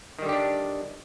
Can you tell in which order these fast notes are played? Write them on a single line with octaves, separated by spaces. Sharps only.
D#3 G3 D3 G4 D4